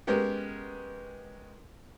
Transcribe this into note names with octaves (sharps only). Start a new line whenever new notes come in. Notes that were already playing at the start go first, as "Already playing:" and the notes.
G#3 B3 C#4 G4 A#4